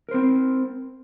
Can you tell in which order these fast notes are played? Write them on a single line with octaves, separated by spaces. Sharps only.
A#4 C5 C4